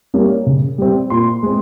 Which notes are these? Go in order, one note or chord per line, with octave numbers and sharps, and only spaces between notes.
G3 A#3 C#4
C#3
G3 C4
A#2 C6
G#3 C4